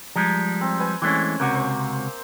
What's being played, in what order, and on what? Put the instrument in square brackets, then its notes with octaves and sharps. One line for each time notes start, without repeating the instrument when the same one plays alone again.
[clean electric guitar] F3 G3 G#3 [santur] A#5
[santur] C4
B4 G#5
[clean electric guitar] E3 G#3 A3 [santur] C4 C#4
[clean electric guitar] C#2 C3 F#4 [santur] A#3
[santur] C5